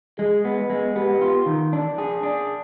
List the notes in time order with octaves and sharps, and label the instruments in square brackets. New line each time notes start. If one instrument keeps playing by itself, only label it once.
[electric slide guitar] G#3 [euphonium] G#4
[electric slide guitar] B3
G#3
[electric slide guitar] B3 [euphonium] G4
[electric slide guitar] F4
D#3
D4
G#4
D4